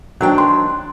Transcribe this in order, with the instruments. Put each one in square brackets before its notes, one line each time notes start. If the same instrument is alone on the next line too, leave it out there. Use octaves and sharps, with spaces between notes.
[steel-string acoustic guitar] D#3 D4 G5 [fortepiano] F#3
[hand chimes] C6